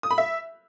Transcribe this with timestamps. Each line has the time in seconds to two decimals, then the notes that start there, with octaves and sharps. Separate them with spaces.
0.03 D#6
0.11 B5
0.18 E5